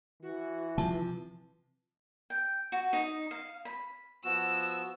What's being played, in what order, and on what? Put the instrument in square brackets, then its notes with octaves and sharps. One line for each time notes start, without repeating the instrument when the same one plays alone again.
[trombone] E3 [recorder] F#4
[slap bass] C3 F3 [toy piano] A5
[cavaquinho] G5
F#4
D#4
F5
B5
[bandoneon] F3 B3 F#4 [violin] E6